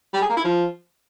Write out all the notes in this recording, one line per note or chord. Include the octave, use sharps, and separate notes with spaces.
G3
G#4
A#3
E4
F3